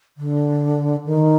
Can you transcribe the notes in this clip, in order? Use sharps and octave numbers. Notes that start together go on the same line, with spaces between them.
D3
D#3